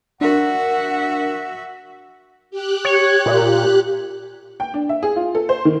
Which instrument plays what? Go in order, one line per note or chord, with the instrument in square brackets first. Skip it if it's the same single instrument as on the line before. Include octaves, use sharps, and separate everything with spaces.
[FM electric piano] D4 A#4 [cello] F#4 E5 [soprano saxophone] F#5
[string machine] G4 F#6
[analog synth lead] C#5
A#2
[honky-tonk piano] G5
D4
E5
G#4
F4
A4
C5
D#3